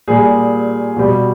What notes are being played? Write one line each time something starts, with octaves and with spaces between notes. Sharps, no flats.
A#2 G3 G#4
B2 G3